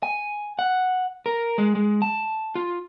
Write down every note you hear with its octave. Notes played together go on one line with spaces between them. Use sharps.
G#5
F#5
A#4
G#3
G#3
A5
F4